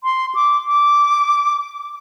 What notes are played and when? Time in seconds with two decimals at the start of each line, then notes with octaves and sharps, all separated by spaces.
0.04 C6
0.35 D6
0.67 D6